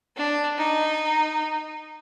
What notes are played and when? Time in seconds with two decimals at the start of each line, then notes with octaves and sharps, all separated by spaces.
0.16 D4
0.58 D#4